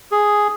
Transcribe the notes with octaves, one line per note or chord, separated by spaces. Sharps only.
G#4